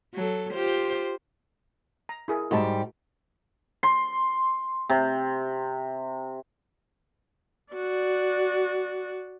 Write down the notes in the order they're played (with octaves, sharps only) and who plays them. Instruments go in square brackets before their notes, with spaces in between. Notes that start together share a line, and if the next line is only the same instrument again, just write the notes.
[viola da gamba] F#3 A4
F4 G4 C5
[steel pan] A#5
E4 G#4 A#4
[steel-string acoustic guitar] G#2 G3 G4 [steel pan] F#4 A5
[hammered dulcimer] C6
C3
[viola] F#4 D5